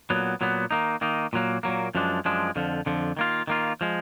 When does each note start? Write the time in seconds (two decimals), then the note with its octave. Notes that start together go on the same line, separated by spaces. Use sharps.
0.10 A#2 F#3 B3
0.41 A#2 F#3 B3
0.71 D#3 A#3 D#4
1.01 D#3 A#3 D#4
1.33 A#2 F#3 A#3
1.63 A#2 F#3 A#3
1.95 F#2 F3 G#3 D4
2.25 F#2 F3 G#3 D4
2.56 F2 D3 F3
2.86 F2 D3 F3
3.17 D#3 A#3 F4
3.47 D#3 A#3 F4
3.81 F3 G#3